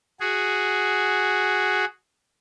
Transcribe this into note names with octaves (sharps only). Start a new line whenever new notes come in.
F#4 G#4